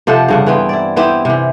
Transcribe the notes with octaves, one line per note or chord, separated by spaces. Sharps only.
C3 F3 A4 F#5
G2 C#3 F#5
E3 B3 C4
E4 D5
B3 C4 E4 G4
C3 E3